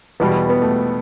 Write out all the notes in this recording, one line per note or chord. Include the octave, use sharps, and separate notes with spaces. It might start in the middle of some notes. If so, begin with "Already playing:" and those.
E2 B2 G3 B3
B3
A3